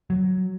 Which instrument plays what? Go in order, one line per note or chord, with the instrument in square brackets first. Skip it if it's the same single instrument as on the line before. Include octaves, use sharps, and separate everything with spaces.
[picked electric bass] F#3